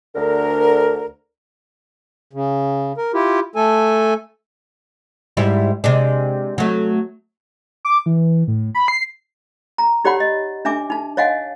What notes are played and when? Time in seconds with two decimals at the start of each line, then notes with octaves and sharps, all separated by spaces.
0.15 D2 D3 A#4
2.33 C#3
2.98 A#4
3.14 E4 F4 G4
3.56 A3 A4 G#5
5.37 G#2 G3 E4
5.84 C3 G#3 D4
6.58 F#3 A3
7.85 D6
8.06 E3
8.48 A2
8.75 B5
8.88 C7
9.78 A#5
10.05 D#4 G4 C#5 D5 F#5 B5
10.20 D#5
10.65 D4 E5 G#5 D6
10.90 D#4 A5
11.17 C#5 D#5 F5 F#5 G#5